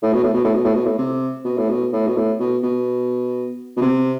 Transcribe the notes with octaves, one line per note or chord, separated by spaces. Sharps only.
A2
B2
A2
B2
A2
B2
A2
B2
A2
C3
B2
A2
B2
A2
B2
A2
B2
B2
B2
C3